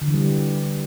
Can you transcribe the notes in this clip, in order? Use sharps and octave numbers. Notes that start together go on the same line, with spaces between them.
D3
E3
G3
D3